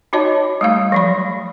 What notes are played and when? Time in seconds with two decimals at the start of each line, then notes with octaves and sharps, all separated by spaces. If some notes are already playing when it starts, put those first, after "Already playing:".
0.13 D#4 F#4 C#5 D#5 A5
0.61 G3 A3 F5
0.92 F3 F#3 B5